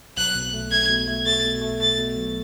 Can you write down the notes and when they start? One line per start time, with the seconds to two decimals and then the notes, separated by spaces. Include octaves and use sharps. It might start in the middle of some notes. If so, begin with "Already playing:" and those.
0.17 B1 F#6
0.35 B2
0.54 A3
0.72 A3 G#6
0.90 B2
1.08 A3
1.26 A3 A6
1.44 B2
1.62 A3
1.80 A3 A6
1.98 B2
2.17 B1